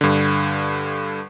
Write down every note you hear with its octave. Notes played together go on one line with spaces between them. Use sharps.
G2 D3